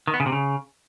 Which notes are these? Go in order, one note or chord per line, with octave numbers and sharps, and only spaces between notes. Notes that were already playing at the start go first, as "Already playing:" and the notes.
D#3
B3
C#3
C3
C#3